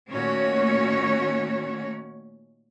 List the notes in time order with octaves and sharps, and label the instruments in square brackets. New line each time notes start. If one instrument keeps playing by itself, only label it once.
[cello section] A#2 D#3 A3 C#4 F#4 C#5